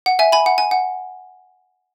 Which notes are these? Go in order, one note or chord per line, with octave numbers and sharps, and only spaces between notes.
F#5
E5 G#5
G#5 B5
F#5
G#5
F#5